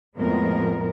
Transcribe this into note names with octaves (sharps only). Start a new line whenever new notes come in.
F2 A2 G#3 B3 A#4